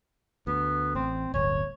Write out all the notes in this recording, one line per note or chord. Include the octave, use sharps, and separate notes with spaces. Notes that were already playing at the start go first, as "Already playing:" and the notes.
D2 B3
A1 C4
D1 G1 C#5